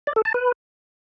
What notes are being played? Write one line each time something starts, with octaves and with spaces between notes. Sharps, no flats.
D5
A4
A5
B4